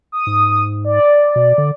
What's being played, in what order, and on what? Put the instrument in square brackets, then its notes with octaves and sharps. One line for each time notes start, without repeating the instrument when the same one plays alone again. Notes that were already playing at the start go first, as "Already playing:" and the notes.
[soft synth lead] D#6
[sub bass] G#2
[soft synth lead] D5
[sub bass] B2
D3